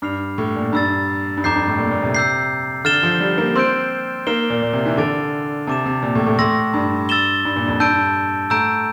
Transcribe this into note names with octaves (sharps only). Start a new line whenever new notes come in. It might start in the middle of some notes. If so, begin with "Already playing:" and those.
G2 D6 F6 C7 F7
A2
A#2
G2 A#5 E6 A6
G2
F2 A#5 D6 G6 C7
G2
A2
A#2
A#2
C3
E6 G6 C7
D3 F6 A6 E7 G7
F3
G3
A#3
C4 C6 E6 G6 D7
A#3 F6 C7 E7 G7
A#2
A#2
C3
E3
D3 A5 D6 A6 D7 F7
C3 A5 D6 A6 E7
C3
A#2
A2
A2
A2 C6 E6 A#6
G2
E6 A6 E7 G7
G2
A#2
F2
G2 A5 E6 G6 D7
A2 A#5 E6 G6 D7